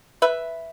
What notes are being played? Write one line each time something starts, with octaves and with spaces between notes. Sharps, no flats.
B4 E5